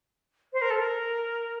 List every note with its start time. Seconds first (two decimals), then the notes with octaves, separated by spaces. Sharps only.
0.53 C5
0.62 A#4
0.70 A4
0.79 A#4